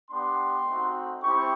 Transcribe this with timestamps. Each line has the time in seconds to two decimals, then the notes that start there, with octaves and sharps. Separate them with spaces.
0.10 B3 D4 G4 C6
0.66 A3 C4 D#4 F#4
1.22 C4 E4 G4 C#6